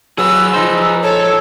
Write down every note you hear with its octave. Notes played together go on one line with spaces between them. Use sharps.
F#3 G#4 B4 E6
F3 D#4 C5
A4 C#5